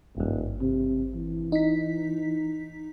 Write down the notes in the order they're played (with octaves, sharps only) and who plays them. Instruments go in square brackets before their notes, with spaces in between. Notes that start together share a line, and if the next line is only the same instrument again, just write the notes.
[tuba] D#1 [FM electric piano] G#1 G2
[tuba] C3
E3
[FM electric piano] D#4 B6